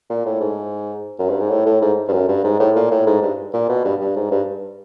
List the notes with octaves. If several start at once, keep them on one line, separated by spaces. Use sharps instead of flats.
A#2
A2
G#2
F#2
G2
G#2
A2
A2
G#2
G2
F#2
G2
G#2
A2
A#2
A2
G#2
G2
A#2
B2
G2
G2
G#2
G2